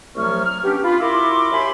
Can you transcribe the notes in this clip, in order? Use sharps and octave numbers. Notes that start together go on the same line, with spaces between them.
C2 F3 F#3 A3 C#6 F6
F6
B3 C#4 D4 G4
F4 B5
E4 F#4 A#4 B5 C6 D6
D#2 G4 E5 G#5 B5 C6